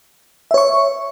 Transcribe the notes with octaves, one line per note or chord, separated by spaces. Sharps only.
C#5 E5 C#6